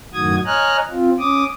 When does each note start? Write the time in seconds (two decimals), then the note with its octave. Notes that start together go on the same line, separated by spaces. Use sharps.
0.13 F#2 A2 D#3 F#4 D#6 G#6
0.46 C#5 D#5 G#5 A#5 F6 F#6
0.91 C4 F4
1.19 C#4 D6 D#6